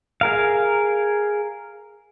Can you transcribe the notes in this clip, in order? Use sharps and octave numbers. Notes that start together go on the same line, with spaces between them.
G#4 A#4 F5